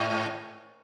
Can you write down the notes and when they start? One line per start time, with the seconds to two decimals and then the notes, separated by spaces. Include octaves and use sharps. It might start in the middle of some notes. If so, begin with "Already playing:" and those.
Already playing: G#2